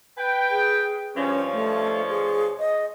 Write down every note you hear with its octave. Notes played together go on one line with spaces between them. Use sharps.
B4 G5
G#4
G2 F3 C#4 C#5
A3
G#4
D#5